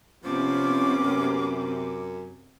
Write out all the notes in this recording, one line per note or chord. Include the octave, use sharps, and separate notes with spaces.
C3 F3 B3 C#4 D6
F#2